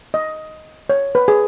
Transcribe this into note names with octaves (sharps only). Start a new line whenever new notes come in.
D#5
C#5
B4
G#4